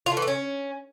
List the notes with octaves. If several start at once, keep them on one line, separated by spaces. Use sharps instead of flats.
F4
A3
E3
A3
C#4